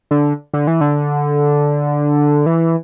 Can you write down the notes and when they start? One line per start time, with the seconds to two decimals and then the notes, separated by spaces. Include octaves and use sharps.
0.11 D3
0.53 D3
0.67 E3
0.81 D3
2.46 E3